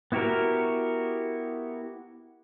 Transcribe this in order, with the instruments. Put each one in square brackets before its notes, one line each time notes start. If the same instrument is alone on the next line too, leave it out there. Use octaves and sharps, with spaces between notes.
[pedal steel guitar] B3 E4 F#4 G4 A#4